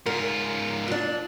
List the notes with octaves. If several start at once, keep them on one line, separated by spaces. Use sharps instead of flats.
G#2 F4 A#4
A#2 D4